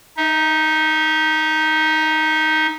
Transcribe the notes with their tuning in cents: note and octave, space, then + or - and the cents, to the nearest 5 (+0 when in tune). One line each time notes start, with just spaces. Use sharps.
D#4 +0 E5 -35